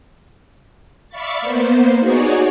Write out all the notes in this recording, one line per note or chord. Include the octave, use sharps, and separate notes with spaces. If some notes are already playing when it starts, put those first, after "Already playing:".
D5 E5 F5 B5 C#6 A6
A#3 B3 C5
D#4 F#4 G#4 C#5 D5